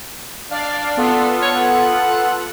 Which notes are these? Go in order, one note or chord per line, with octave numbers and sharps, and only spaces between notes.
D4 D5 F5
B3 F4 A4
C#5
F#5